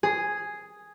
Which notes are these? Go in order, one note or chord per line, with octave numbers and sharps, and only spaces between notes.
G#4